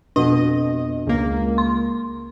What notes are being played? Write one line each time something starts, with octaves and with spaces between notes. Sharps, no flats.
F2 B2 D4 D#5
C#2 A#3
C6